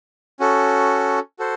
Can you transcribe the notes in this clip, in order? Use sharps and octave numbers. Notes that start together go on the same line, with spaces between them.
C#4 F#4 A4
F#4 A4 C5